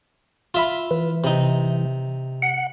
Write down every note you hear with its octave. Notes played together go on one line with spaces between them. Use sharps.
F4 E5 B5
E3
C3 D#4
F#5